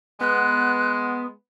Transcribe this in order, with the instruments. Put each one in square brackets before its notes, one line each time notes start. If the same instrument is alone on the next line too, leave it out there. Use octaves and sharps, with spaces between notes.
[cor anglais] G#3 [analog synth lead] B3 [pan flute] F#6